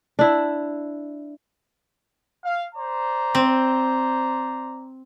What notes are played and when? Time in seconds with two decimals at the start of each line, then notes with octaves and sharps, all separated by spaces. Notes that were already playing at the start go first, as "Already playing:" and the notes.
0.19 D4 E4
2.44 F5
2.75 C5 D5 A#5
3.35 C4